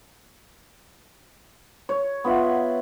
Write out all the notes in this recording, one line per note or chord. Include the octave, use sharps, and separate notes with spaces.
C#5
B3 F4 E5 F#5